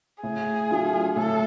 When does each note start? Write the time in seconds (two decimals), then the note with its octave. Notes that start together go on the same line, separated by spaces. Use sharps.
0.23 A2 G#4
0.70 F#3 A3 D4 F4
1.16 A2 A4